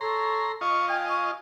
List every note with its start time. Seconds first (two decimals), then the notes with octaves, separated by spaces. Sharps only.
0.01 A4 C#5 A#5 C6
0.61 F4 D#5 C#6
0.89 G5 G#5
1.09 C#6